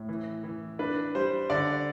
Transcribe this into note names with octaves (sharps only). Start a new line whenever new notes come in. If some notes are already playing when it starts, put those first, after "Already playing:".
Already playing: A2
E3
E3
D4 B4
G3 C5
D3 D5